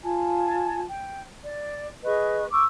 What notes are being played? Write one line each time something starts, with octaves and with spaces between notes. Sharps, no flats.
F4 G#5 A5
G5
D5
G#4 B4 D#5 C#6
C#6 D6 E6